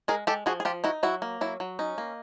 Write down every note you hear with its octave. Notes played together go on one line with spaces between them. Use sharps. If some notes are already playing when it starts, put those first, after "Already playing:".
G#3 G#4 A#4
G#3 G4 A4
F3 F#4 G#4
G#4
F3 F4 G4
D#4 E4 F#4
F#3 E4 F#4
A#3
F#3 E4
F#3
C#4 D#4
A#3